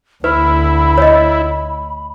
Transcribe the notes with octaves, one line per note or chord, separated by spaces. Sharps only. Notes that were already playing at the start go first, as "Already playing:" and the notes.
D2 E4 B4 B5
C#5 D#5